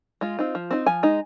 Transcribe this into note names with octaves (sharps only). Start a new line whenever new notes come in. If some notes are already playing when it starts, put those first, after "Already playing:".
G#3 F4
C4 D#4
F3
C4 D#4
F3 G#5
G#3 D#4